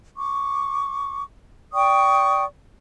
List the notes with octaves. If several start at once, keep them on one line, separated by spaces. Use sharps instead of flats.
C#6 D6
D5 G5 C#6 D#6